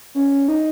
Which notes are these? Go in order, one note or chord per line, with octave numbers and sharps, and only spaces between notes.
C#4
D#4